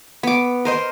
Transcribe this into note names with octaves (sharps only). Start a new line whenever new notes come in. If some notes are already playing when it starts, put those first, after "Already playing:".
B3 D6
A#4 C5 D#5